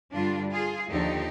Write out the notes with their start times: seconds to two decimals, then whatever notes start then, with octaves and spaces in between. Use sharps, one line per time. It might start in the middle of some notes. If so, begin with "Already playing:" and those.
0.13 G2 D3 G3 D4 F4
0.51 F4 G#4
0.89 D#2 D3 F3 D#4 G4